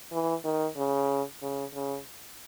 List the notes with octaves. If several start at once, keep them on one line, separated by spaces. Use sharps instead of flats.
E3
D#3
C#3
C#3
C#3